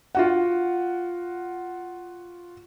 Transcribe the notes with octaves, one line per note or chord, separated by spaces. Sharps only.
F4 F#4 F#5